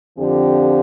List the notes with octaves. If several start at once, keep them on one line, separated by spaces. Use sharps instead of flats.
F2 D3 F3 C4 G4